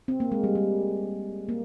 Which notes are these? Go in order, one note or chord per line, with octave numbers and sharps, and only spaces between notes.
C4
A#3
G#3
G3
G3
A#3